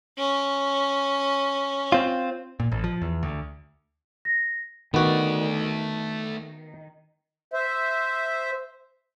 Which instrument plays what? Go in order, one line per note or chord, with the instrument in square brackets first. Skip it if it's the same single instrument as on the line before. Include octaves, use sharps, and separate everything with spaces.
[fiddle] C#4
[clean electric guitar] C4 F4
[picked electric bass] A#2
A1
F3
E2
D2
[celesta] A#6
[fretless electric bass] D#3 [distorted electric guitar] A3 D5 [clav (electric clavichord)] B3 F#4
[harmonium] C5 E5